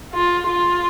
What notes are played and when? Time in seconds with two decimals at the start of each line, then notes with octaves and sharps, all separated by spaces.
0.13 F4
0.48 F4